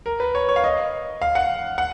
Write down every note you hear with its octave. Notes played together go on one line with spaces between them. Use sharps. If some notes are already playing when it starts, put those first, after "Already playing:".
A#4
B4
C#5
C#5
F5
D#5
F5
F#5
F#5